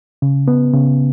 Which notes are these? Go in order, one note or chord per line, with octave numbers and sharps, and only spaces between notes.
C#3
B3
C#3